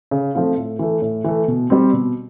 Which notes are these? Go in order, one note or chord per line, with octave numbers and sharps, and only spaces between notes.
C#3
F3 A3 C4 F4
A2
E3 A3
A2
E3 A3
B2
G3 C4
B2